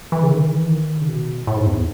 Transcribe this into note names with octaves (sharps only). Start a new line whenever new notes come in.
E3
C#3
D#3
E3
D#3
C#3
B2
A2
G#2
E2